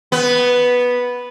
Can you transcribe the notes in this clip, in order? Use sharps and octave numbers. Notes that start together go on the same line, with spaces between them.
B3